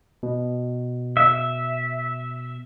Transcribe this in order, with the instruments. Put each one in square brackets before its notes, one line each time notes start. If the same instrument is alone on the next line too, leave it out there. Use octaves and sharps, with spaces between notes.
[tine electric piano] B2
[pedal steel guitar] E5